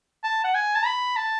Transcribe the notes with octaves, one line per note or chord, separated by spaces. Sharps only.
A5
F#5
G#5
A5
B5
A5